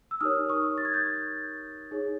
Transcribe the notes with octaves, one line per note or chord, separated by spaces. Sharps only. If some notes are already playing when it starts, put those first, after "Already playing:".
E6
D#4 G4 A#4 C#5 D#6 F6
C#6 D#6
A6
G#6
G6 A6
D#4 G#4 C#5